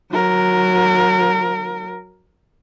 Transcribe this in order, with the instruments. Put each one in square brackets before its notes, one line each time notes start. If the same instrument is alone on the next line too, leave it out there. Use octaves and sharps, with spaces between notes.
[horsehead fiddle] F#3 A#4